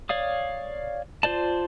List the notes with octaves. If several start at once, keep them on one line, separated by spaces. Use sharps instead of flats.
C#5 D5 F5 D#6
F4 C5 D5 A5